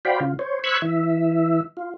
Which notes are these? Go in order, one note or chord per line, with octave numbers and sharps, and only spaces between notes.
F#4 C5 D5 F5 G5 B5
C#3 F4
C5 C#5
C5 B5 C#6 E6 F#6 G#6
E3 E5
F4